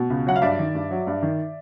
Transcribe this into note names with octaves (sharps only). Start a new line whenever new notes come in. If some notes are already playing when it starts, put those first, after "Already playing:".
Already playing: B2
C#2
F#3 F#5
F5
G2 D5 E5
D#3
G2
F#3
G2
D#3